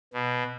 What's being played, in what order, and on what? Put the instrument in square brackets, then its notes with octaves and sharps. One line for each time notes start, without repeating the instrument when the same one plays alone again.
[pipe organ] B2